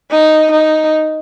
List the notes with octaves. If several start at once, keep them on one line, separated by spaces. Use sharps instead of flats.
D#4
D#4